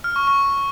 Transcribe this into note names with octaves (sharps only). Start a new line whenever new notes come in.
F6
C#6
C#6